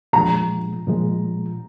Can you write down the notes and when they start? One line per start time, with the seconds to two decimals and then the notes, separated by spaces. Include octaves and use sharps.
0.13 A#2 F3 G#3 A#5
0.87 A#2 F3 G#3